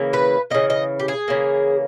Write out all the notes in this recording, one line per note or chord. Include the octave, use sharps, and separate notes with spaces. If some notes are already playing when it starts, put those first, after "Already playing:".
Already playing: C#3 E3 A#3
B4
C#3 E3 A#3 D#5
D#5
G4
G#4
C#3 E3 A#3